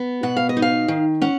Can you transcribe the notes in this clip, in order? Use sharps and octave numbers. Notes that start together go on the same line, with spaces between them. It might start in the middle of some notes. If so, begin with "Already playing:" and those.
Already playing: B3
B2 F#5
F5
D#5
D#4
F5
D#3
C#4 F#5